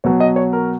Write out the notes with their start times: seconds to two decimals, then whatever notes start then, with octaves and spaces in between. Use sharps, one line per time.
0.04 B2 F#3 C#5
0.20 D#5
0.36 C#5
0.53 A#4